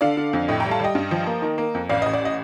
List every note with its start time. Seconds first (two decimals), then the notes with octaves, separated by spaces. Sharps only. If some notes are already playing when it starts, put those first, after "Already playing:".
0.01 D3 D5 F5
0.17 D3
0.33 F2
0.48 A2 D#5 G5
0.60 G3 G5 A#5
0.71 F5 A5
0.80 G3 D#5 G5
0.95 G2
1.11 F3
1.27 A#3
1.42 D#3
1.58 A#3
1.75 F2
1.89 A1 D5 F5
2.02 A1 D#5
2.13 D5
2.25 D#5